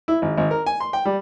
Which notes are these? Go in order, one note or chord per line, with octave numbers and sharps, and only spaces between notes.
E4
G#1
G#1
A#4
G#5
C6
G5
G3